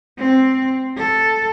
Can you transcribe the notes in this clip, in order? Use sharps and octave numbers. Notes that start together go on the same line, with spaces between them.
C4
A4